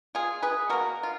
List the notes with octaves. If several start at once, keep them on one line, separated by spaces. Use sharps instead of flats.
F4 G#4
G#4 B4
B2 A#3 F#4 A#4
F4